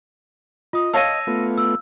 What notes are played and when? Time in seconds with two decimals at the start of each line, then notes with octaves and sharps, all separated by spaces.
0.73 F4 D#5 D#6
0.93 C#5 F5 A5 E6 A#6 D#7
1.27 A3 B3 F4
1.58 E6